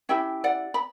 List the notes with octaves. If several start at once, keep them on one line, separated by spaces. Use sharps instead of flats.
C#4 E4 G4 E5 G5
D5 F#5
B5